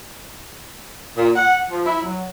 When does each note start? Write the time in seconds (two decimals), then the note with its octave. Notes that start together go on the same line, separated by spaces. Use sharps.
1.15 A#2
1.35 F#5
1.69 F3
1.86 E4
2.02 F#3